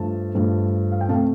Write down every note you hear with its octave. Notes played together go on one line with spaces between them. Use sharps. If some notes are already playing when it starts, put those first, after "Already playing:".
Already playing: G2 F3 A3 A5
G2 F3 A3
F5
G5
C3 A3 F5 A5